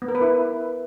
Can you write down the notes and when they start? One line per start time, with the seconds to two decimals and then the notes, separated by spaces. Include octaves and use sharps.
0.02 B3
0.08 A#4
0.15 B4
0.21 E4